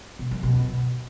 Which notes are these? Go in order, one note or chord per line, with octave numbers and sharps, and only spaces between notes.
B2
F#2
B2